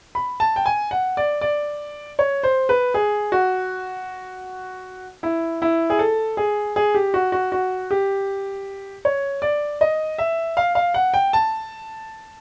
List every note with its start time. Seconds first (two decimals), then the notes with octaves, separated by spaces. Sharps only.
0.15 B5
0.40 A5
0.56 G5
0.66 G#5
0.91 F#5
1.17 D5
1.41 D5
2.19 C#5
2.43 C5
2.69 B4
2.94 G#4
3.32 F#4
5.23 E4
5.62 E4
5.90 G#4
5.99 A4
6.37 G#4
6.76 G#4
6.94 G4
7.14 F#4
7.32 F#4
7.52 F#4
7.91 G4
9.05 C#5
9.42 D5
9.81 D#5
10.18 E5
10.57 F5
10.75 F5
10.94 F#5
11.14 G5
11.33 A5